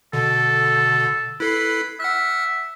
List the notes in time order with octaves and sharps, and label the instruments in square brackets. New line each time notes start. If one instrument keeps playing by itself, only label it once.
[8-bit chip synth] B2 D3 [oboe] A4
[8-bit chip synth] E4 A4 C7 [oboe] B4
[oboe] E5 [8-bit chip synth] F#5 F6 F#6